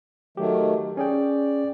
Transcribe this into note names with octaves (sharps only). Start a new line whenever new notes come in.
D#3 F#3 A3 G4
C#4 G#4 D5 G5